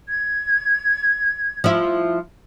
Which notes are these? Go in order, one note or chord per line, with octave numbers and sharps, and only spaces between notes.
G#6
F3 E4